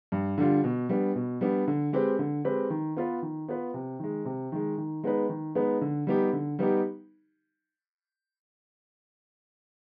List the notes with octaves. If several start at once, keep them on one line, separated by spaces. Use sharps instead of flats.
G2
D3 G3 D4 F4
B2
G3 B3 D4
B2
G3 B3 D4
D3
G#3 C4 G4 B4
D3
G#3 C4 G4 B4
D#3
B3 F4 B4
D#3
B3 F4 B4
C3
D#3 G#3
C3
D#3 G#3
D#3
G#3 B3 D#4 B4
D#3
G#3 B3 D#4 B4
D3
G3 B3 D#4 G4
D3
G3 B3 D#4 G4